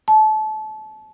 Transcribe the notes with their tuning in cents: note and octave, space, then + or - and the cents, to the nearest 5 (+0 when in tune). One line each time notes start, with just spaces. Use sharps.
A5 -30